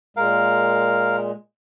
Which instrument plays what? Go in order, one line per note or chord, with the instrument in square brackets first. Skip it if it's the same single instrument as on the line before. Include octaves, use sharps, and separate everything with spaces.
[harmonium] A#2 G#3 [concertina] A#4 F5